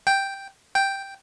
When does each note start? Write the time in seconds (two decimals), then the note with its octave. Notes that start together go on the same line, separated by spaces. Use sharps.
0.07 G5
0.75 G5